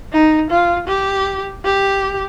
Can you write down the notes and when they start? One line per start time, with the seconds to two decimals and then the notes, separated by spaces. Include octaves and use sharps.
0.13 D#4
0.50 F4
0.88 G4
1.65 G4